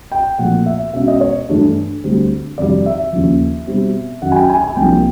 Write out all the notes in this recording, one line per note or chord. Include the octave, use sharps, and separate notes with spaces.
G5
A#2 F3 A3 C4 F#5
E5
B2 G#3 C#4 E5
D#5
C#5
G2 E3 A3 D4
D2 D3 G3 C4
F2 C3 D#3 G3 D5
E5
D#2 C#3 F3
B2 G3 C4
F#2 D#3 F#3 F#5
G#5
G5
G#5
G#5
C2 C3 F3 A#3 G5